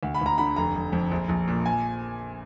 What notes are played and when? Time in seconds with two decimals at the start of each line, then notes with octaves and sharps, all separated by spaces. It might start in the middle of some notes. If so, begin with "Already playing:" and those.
0.03 D2
0.14 B5
0.21 D2 A#5
0.38 D3 B5
0.56 F1 A#5
0.75 F1
0.93 F2
1.11 A#1
1.29 A#1
1.48 A#2
1.66 G#5